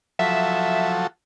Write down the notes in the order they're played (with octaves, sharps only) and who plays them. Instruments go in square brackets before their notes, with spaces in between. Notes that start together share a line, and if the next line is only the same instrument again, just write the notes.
[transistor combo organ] F3 F#3 A4 [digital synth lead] E5